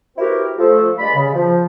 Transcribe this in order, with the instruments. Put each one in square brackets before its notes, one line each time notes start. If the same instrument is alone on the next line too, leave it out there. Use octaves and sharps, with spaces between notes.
[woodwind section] C4 E4 F#4 G4 A#4 B4
F3 A3 A4
G2 G#3 D5 B5
C#3
F3